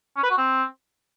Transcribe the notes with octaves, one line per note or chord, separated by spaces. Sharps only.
C#4
B4
F#4
C4